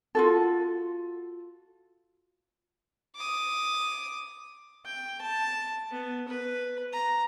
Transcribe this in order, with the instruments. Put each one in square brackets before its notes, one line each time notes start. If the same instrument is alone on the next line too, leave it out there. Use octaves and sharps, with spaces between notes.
[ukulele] F4 F#4 A4
[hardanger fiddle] D6 D#6
[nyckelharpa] G5
A5
B3
B4
A#5